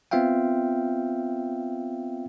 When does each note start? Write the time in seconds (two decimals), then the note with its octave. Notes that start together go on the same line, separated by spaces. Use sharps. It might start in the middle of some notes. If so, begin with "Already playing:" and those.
0.11 B3 C4 F4 E5 F5 G5